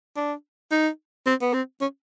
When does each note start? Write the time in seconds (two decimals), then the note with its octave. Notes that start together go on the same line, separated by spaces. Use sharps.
0.17 D4
0.72 D#4
1.26 C4
1.42 B3
1.54 C4
1.81 C#4